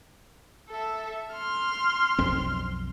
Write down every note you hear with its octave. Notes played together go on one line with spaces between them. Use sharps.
A4 E5
C6 F6
B1 F2 C4